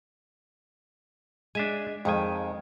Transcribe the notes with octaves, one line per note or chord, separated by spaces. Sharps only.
G#3 D4 E5 G#5
F2 D#3 G#3 G#5